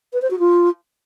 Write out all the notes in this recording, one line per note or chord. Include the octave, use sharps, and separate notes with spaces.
B4
C5
F#4
F4